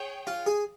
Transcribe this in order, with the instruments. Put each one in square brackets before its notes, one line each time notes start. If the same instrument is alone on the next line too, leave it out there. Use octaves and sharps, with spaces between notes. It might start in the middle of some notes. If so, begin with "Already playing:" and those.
Already playing: [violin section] G#4 C#5 G5
[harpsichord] F4
G#4